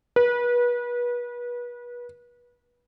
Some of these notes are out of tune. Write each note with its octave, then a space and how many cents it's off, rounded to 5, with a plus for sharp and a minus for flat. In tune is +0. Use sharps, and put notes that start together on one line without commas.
B4 -30